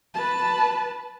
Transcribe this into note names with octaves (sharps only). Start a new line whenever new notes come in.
B4 A5